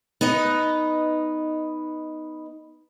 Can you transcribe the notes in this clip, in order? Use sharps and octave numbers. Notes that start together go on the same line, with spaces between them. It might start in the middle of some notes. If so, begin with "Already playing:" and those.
B3 D#4 B4 D#5